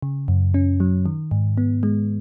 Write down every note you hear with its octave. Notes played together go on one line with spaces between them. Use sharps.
C#3
F#2
C#4
F#3
D#3
G#2
B3
G#3